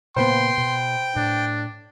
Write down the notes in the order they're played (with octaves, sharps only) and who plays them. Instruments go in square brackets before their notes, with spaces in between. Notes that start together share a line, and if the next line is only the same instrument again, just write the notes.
[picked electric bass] A#2 C#3 A#3 [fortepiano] B3 C5 [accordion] G5 [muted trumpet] C6
[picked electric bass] B2
[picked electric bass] A2 [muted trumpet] D4